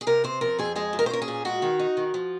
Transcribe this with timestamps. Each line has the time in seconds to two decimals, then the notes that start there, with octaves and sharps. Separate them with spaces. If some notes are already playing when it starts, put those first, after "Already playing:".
0.01 G#4
0.07 C3 A#4
0.24 C4 C5
0.41 F3 A#4
0.58 F2 G#4
0.76 G#3 G#4
0.93 A#2
0.99 A#4
1.06 C5
1.10 C#4 A#4
1.22 G#4
1.28 A#2
1.45 G#3 F#4
1.62 D#3
1.79 D#4
1.97 D#3
2.14 F3